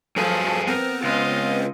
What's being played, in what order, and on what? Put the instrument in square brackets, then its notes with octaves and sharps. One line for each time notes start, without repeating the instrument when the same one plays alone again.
[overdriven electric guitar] G2 G#4 [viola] F3 [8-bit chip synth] F#3 A4
[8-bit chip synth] B3 C4 [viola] A#4
[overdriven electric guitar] C#2 [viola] F4 D#5